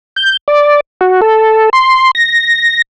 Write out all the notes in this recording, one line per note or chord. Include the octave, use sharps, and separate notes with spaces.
G6
D5
F#4
A4
C6
A#6